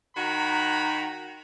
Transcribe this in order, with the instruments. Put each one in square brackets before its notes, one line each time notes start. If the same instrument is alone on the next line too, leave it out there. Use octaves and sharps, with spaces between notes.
[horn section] D#3 F#4 A#5 B5